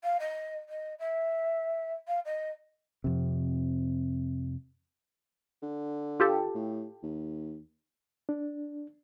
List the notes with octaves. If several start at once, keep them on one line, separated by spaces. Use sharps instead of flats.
F5
D#5
D#5
E5
F5
D#5
F2 C3
D3
F4 G4 A4
A2
D#2
D4